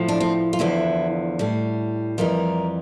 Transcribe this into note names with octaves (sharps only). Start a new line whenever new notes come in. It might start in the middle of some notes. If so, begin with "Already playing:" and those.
Already playing: A2 F3
D4
C4
F4
E2 D3 F3 E4
A2 G3
F2 E3 G3 A#4